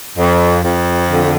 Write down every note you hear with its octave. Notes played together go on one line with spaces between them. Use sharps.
F2
F2
D3